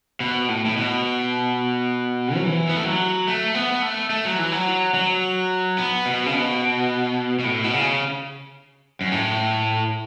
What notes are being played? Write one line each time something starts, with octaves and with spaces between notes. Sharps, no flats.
B2
A2
A2
B2
F#3
E3
B3
A3
F#3
A3
B3
A3
A3
F#3
E3
F#3
F#3
B3
B2
C#3
B2
B2
A2
B2
C#3
F#2
A2